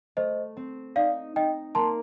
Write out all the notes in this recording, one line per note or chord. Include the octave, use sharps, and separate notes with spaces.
A3 C5 D#5
C4
D#4 D5 F5
D#4 D#5 G5
A#3 A5 C6